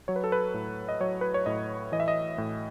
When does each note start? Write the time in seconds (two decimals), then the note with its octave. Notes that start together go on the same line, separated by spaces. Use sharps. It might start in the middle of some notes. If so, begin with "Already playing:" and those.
0.08 F#3 C#5
0.16 B4
0.24 A4
0.32 B4
0.54 A2
0.89 D#5
1.00 F#3 C#5
1.21 B4
1.34 C#5
1.46 A2 D#5
1.92 E3 D#5
2.00 E5
2.08 D#5
2.38 A2